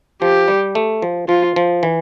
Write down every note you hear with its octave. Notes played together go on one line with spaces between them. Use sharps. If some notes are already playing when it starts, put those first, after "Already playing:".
F3 G4
G3
A3
F3
F3 F4
F3
E3